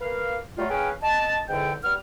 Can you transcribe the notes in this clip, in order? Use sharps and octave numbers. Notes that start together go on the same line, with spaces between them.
A#3 B4 F5
F#3 G3 A3 F4
C#4 G#4 B4 F5 G5
D#5 A5
E2 G#2 D3 G5
G3 B3 F6